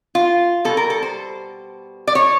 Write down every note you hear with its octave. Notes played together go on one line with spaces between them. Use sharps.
F4
B2 G3 A4
A#4
A4
C5
D5
C#5